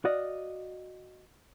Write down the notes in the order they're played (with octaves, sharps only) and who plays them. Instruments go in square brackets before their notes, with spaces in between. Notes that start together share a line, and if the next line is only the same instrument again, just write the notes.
[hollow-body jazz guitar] F#4 D5 D#5 F5